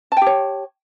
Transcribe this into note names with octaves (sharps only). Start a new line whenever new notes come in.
G4 C#5 G5 A5